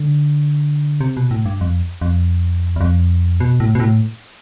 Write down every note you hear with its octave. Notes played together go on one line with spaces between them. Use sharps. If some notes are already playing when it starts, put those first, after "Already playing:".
Already playing: D3
C3
B2
A2
G2
F2
F2
E2
F2
B2
A2
B2
A2